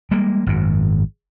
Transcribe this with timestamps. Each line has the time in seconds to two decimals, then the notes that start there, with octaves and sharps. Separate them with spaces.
0.11 G3 G#3 A#3
0.46 G#1 F#2